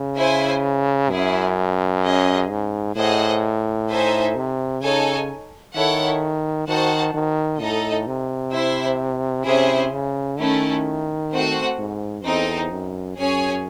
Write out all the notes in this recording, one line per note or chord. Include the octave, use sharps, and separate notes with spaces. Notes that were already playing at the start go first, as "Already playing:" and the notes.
Already playing: C#3
E4 C5 E5 G#5
F#2 C#4 E4 G#4
C#4 G#4 D#5
G#2
A2 G#4 C5 D#5 F#5
D#4 A4 C5 E5 G#5
C3
C#3 D#4 A4 C#5 G#5
D#3 E4 A4 C#5 F#5
D#3 F#4 C5 F#5 A5
D#3
A2 D#4 A4 D#5
C3
E4 C5 E5
C3 C#4 E4 G#4 C5 E5
C#3
D#3 A3 C#4 E4
A3 C4 F#4 C5 F#5
G#2
E2 C4 D#4 A4
F#2
F#2 C#4 G#4 C#5 G#5